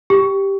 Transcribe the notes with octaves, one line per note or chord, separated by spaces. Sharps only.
G4